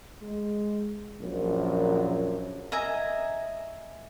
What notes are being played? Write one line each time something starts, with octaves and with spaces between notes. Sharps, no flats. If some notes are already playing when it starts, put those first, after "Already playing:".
G#3
A#1 F#2
D#5 E5 G#5 A#5